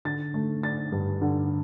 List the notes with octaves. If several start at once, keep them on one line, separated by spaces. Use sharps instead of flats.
D3 A6
A3
D4 A6
G2
D3